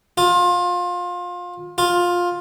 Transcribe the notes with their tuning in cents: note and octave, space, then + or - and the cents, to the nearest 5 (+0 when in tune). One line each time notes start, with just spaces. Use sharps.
F4 +25
F4 +15